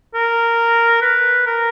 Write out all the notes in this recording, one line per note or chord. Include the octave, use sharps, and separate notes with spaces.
A#4
B4
A#4